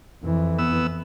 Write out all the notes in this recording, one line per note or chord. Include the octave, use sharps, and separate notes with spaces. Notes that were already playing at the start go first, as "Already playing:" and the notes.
F2 E3
B3 E6